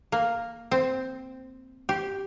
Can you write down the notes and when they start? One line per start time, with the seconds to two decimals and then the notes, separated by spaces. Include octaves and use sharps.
0.12 A#3
0.71 C4
1.89 G4